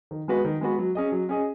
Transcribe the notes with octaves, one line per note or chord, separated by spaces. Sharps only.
D#3
G#3 B3 F#4 B4
D#3
G#3 B3 F#4 B4
F#3
C#4 G#4 D#5
F#3
C#4 G#4 D#5